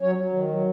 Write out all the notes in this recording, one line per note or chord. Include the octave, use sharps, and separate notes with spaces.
F#3 C#4 C#5
F#3
D#3
F#3